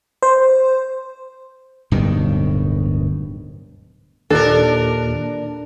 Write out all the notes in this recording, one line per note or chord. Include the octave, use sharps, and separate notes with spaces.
C5
D1 G2 B2 D#3
D#2 A#2 D4 A4 A#4